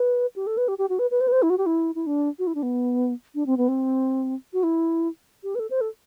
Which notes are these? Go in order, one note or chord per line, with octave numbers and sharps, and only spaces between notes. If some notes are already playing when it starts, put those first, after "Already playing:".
Already playing: B4
G4
A4
B4
G4
G4
F#4
B4
B4
C5
B4
C5
E4
F#4
G4
E4
E4
D4
F#4
E4
D4
B3
D4
C4
B3
C4
F#4
E4
G4
B4
A4
C5
A4